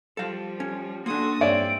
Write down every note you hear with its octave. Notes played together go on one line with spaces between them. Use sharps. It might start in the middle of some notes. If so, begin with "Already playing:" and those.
F3 G3 A4 F5
C#4
A#3 D4 F#4 A4 C6 D#6
G2 C4 C#5 D5 E5 D7